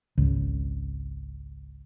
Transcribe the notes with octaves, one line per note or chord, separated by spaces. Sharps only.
G#1 C#2